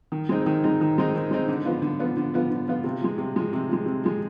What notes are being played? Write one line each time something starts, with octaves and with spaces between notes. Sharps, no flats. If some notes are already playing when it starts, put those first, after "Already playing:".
D#3
G#3 C4 D#4
D#3
G#3 C4 D#4
D#3
G#3 C4 D#4
D#3
G#3 C4 D#4
D3
F3 B3 F4
D3
F3 B3 F4
D3
F3 B3 F4
D3
F3 B3 F4
C3
F3 G#3
C3
F3 G#3
C3
F3 G#3
C3
F3 G#3